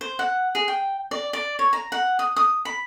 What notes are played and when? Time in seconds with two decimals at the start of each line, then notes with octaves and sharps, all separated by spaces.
0.01 C5
0.19 F#5
0.55 G#4
0.68 G5
1.11 D5
1.33 D5
1.59 C#5
1.73 A#5
1.92 F#5
2.19 D#6
2.36 D#6
2.65 B5